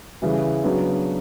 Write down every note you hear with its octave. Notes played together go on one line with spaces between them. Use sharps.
C#3 E3 G3
C#3 F#3 B3 D4